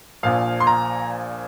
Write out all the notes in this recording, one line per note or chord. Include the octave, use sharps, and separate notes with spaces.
A#1 A#2 F3 F5
C6
A#5